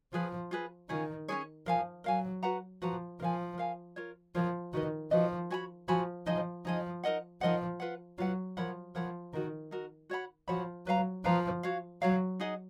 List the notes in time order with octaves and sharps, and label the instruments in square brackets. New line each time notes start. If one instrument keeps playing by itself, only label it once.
[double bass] F3 [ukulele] F4 G#4 B4
[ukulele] F4 G#4 B4
[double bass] D#3 [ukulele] C#4 F4 G#4 C#5
[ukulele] C#4 F4 G#4 C#5
[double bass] F3 [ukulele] A#4 F5 G#5
[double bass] F#3 [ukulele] A#4 F5 G#5
[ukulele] F#4 B4 F#5 A#5
[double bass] F3 [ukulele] F#4 B4 F#5 A#5
[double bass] F3 [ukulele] A#4 F5 G#5
[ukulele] A#4 F5 G#5
F4 A#4 C#5
[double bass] F3 [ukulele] F4 A#4 C#5
[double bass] D#3 [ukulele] F#4 B4 D#5
[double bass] F3 [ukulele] F#4 B4 D#5
[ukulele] F#4 C#5 G#5 B5
[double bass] F3 [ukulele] F#4 C#5 G#5 B5
[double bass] F3 [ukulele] D#4 G#4 D#5
[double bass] F3 [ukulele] D#4 G#4 D#5
[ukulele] D#4 A#4 D#5 F#5
[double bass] F3 [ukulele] D#4 A#4 D#5 F#5
[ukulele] F4 B4 F#5
[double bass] F#3 [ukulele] F4 B4 F#5
[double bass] F3 [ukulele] A#4 C#5 F#5 B5
[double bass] F3 [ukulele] A#4 C#5 F#5 B5
[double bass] D#3 [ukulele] D#4 F#4 A#4
[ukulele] D#4 F#4 A#4
F#4 C#5 F#5 B5
[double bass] F3 [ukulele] F#4 C#5 F#5 B5
[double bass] F#3 [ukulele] B4 F5 A#5
[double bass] F3 [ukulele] B4 F5 A#5
[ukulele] F#4 C#5 F5
[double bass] F#3 [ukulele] F#4 C#5 F5
[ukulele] D#4 G#4 D#5 F#5